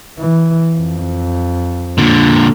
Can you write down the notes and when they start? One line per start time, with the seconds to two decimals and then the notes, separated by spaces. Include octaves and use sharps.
0.19 E3
0.77 F2
1.98 A#2 D3